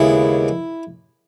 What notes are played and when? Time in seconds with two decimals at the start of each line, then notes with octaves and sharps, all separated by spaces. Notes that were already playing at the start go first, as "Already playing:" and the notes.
Already playing: D#2 C#3 G#3 B3 E4